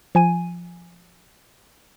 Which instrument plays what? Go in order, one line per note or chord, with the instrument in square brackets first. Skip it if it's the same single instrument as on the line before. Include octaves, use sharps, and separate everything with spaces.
[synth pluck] F3 G#5 D#7